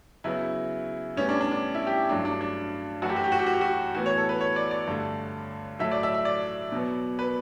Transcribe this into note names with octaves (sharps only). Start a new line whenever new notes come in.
C#3 F#3 B3 E4
A2 G3 B3 C#4
D4
D4
D4
E4
G4
G2 F#3 A3 D4
D4
D4
F#2 E3 A3 F#4
G4
F#4
G4
F#4
G4
F#4
G4
F#4
A2 E3 B3 F#4
C#5
A4
B4
C#5
D5
D5
G2 D3 A3
A2 F#3 A3 E5
D5
E5
E5
D5
B2 F#3 B3
B4